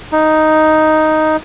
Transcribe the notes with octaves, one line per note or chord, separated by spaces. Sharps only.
D#4